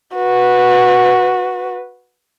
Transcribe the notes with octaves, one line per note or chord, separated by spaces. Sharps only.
F#4 B4